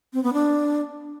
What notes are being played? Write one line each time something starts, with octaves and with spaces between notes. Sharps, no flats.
C4
B3
D4